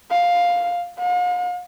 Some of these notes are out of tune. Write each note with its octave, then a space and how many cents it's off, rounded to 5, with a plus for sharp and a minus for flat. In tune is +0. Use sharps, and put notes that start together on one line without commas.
F5 +5
F5 +45